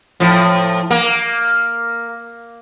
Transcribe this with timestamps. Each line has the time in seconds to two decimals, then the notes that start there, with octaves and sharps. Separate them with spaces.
0.20 A2 F3
0.91 A#3